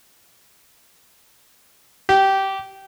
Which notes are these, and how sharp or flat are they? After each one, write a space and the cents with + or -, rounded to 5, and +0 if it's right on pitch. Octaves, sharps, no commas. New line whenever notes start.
G4 -15